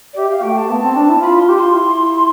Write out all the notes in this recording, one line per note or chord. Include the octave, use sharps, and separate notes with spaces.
D5
G4 E5
F5
A3 G5
A5
B3
C4
D4
E4
F4 B5
F4 C6
G4
F4 C6
E4